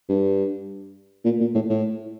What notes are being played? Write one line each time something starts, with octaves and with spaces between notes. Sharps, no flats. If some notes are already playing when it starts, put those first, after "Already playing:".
G2
A#2
A#2
A2
A2